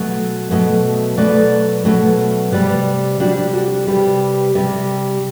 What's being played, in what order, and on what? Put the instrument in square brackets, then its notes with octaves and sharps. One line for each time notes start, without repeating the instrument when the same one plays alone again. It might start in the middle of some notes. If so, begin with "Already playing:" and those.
Already playing: [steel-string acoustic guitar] B2 F#3 A3
B2 F#3 A3
B2 F#3 A3 B4 D5
B2 F#3 A3
C3 G3 B4 D5
C3 G3 D4 F#4
F#4 A4
C3 G3 G4 B4
C3 G3